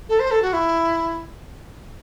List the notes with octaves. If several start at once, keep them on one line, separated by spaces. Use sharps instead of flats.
A4
C5
A4
F#4
E4